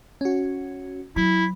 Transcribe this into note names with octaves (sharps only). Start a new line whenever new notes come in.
C#4 F#4
F#3 E4 B5